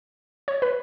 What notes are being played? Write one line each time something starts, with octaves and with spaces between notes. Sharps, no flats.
C#5
B4